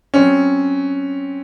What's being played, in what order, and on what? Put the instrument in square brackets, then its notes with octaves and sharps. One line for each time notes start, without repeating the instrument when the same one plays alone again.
[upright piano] F#3 C4 C#4